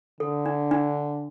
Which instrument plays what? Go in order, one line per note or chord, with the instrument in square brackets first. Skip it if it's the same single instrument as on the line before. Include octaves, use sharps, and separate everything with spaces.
[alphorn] D3 [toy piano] A4
[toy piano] D4
D4